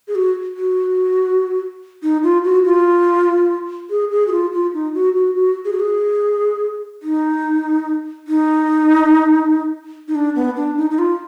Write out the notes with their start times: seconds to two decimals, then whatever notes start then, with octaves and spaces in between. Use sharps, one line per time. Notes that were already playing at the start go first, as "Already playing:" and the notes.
0.08 G#4
0.15 F#4
0.57 F#4
2.03 D#4
2.23 F4
2.44 F#4
2.65 F4
3.90 G#4
4.11 G#4
4.27 F#4
4.32 F4
4.52 F4
4.74 D#4
4.94 F#4
5.16 F#4
5.36 F#4
5.65 G#4
5.72 F#4
5.80 G#4
7.03 D#4
8.28 D#4
10.08 D#4
10.15 D4
10.36 B3
10.56 D4
10.77 D#4
10.90 D#4
10.99 F4